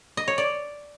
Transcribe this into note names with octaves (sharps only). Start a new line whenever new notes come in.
D#5
C#5
D5